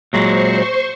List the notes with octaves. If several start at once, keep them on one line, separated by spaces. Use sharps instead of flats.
A#2 F#3 G#3 C5 C6 C#6